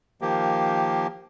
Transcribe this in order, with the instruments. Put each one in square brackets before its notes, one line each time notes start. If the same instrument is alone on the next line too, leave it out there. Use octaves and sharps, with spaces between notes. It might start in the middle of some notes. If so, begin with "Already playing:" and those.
[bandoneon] D#3 F3 A#3 G4